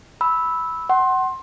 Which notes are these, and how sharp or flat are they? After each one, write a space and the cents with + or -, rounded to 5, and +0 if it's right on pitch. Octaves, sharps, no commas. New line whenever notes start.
B5 +0 E6 -10
F#5 +25 C6 +20